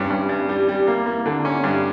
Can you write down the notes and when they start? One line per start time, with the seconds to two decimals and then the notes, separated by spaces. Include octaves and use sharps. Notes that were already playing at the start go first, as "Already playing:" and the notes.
Already playing: G2 C#4
0.10 G2
0.29 G2
0.49 G3
0.68 G3
0.87 A#3
1.06 A#3
1.26 D3
1.45 C#4
1.64 G2